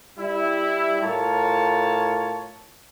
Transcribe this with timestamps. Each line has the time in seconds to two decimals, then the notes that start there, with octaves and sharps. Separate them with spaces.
0.18 G3 E4
1.02 A2 F4 A#4 C#5 A5